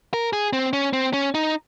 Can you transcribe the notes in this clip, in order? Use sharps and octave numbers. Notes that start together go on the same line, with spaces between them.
A#4
G#4
C4
C#4
C4
C#4
D#4